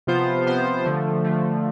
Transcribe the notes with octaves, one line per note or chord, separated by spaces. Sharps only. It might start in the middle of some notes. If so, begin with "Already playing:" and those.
C3 F3 B3 F4 C5
C3 F3 B3 F4 C5
D3 F3 A3
D3 F3 A3